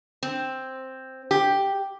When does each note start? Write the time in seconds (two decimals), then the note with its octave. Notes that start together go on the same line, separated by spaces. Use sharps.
0.23 C4
1.31 G4